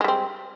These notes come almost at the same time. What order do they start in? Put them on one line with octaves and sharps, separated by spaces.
G#3 G3 C4